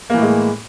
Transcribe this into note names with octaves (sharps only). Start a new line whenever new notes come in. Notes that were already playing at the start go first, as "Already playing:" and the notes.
A2 E3 G#3 A#3